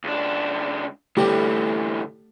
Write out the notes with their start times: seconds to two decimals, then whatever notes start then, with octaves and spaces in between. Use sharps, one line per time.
0.04 C#2 D4
1.17 D2 A2 D3 E3 G3 A3 G4